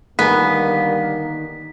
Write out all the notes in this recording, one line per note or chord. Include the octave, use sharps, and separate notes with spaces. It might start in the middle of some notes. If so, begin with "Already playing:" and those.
D3 D#3 G3 A#3 B3 D#5 G#5 B6